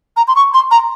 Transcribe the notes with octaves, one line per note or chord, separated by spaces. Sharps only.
A#5
C6
C#6
C6
A#5